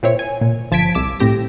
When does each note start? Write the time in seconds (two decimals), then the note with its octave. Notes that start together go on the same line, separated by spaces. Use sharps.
0.03 A#2 C4 E4 C#5
0.19 G#5
0.41 A#2
0.71 G1 F3 A5 G#6 B6 D7
0.95 C2 D6 E6
1.20 A2 C4 G4 A#6